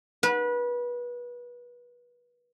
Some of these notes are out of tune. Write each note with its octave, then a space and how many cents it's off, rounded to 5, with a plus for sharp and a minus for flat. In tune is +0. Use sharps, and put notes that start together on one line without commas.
B4 -25